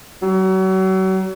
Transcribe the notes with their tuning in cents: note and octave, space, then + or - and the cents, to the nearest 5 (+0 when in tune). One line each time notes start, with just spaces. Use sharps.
F#3 +35